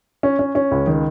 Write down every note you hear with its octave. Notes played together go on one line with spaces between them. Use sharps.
C#4
C#4
C#4
C#2
D#3